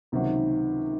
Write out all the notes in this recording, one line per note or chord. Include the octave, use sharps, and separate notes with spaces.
C#2 C3 D#3 F#3 A#3